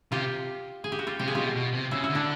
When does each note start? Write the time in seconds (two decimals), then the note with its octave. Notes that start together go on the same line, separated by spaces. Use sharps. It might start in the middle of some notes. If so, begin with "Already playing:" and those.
0.12 C3 F4 G4
0.84 G#4
0.92 G4
0.99 F#4
1.07 F4 G4
1.19 C3 G4
1.28 G#4
1.35 B2 F4 G4
1.56 B2
1.73 C3
1.91 C#3 E4 F#4
2.04 E4 F#4
2.10 D3
2.15 D4 E4